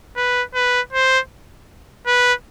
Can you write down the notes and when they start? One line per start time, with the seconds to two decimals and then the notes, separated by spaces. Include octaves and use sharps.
0.16 B4
0.55 B4
0.93 C5
2.07 B4